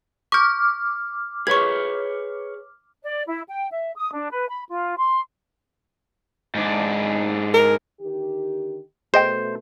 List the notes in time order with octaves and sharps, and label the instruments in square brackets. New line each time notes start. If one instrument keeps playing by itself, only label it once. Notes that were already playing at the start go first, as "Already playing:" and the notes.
[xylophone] C#6 G6 [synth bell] D6 F6
[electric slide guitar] G#4 B4 C#5 [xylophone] C#6 G#6
[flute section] D5
E4
G5
E5
D#6
D4
B4
B5
F4
C6
[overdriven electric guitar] G#2 D4
[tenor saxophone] A#4
[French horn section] D3 D#3 G4
[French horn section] B2 A3 [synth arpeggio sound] G#4 D#5 G5 [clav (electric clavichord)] C5